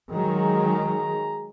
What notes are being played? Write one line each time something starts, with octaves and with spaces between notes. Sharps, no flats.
D#3 F#3 G#3 G#4 A#5